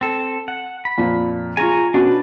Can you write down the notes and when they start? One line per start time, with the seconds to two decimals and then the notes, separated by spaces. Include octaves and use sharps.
0.01 C4 A4
0.48 F#5
0.85 B5
0.98 F2 A#2
1.57 F4 G#4 G#5 A#5 C#6
1.94 B2 C#4 D4 F#4 B4